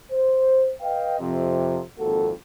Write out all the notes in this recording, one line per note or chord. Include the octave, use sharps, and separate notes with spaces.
C5
B4 D#5 F5 G5
F2 C3
G#1 F2 A#3 F#4 A4